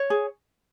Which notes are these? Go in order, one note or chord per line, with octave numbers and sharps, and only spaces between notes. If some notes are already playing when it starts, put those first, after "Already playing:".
Already playing: C#5
G#4